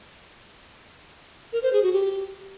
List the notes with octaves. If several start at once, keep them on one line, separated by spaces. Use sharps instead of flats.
A#4
C5
G#4
F#4
G4